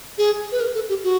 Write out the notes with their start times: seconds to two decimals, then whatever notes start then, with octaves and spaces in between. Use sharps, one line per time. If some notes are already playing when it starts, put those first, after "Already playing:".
0.18 G#4
0.52 B4
0.60 A#4
0.75 A4
0.89 G4
1.04 F#4